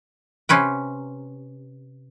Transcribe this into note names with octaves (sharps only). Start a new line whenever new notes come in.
C3 C#4 B4 G5